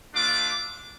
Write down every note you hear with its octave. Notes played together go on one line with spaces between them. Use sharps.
A3 D4 F4 D6